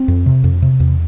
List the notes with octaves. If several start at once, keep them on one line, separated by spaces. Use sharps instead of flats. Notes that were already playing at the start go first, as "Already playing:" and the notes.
Already playing: C4
F2
C3
F2
C3
E2